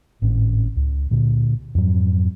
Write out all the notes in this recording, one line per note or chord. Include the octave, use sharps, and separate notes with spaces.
G#1 A2 C#4
C#2
A#2 D3
F2 G#2 F#3